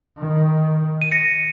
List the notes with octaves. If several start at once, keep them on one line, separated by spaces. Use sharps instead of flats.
D#3
D#7
A#6 C#7